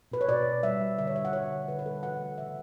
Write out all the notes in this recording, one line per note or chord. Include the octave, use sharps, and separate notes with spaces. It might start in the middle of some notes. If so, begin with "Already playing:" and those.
B2 B4
C#5
B2 D5
B2
G3 E5
G3
D3 E5
C#5
G3 E5
F#5
G3 C#5
D3
D3 B4
B4
G3 A4
E3 F#5
A3
C#3 E5